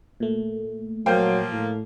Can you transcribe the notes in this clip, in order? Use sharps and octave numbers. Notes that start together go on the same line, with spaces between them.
A#2 A3
F3 F#3 A#3 C5 F5 G5
A2